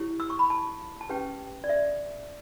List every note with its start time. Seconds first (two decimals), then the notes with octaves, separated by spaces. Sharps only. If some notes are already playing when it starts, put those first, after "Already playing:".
Already playing: E4 G4 C#5
0.20 E6
0.30 C#6
0.39 B5
0.50 A5
1.01 A5
1.09 C#4 G4 B4 G5
1.64 D5
1.69 E5